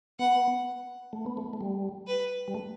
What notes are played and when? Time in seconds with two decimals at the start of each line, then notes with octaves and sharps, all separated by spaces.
0.19 B3 F#5
1.13 A3
1.26 B3
1.37 A3
1.53 A3
1.61 G3
2.07 B4
2.48 G3
2.55 A3